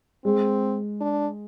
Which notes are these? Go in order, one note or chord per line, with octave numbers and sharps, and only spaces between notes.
G#3 C4
D4